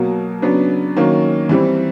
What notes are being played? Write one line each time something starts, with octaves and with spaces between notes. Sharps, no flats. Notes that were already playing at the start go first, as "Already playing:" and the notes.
Already playing: B2 F#3 A#3
C#3 F#3 B3 D4
D#3 F#3 A#3 C#4
E3 G3 C4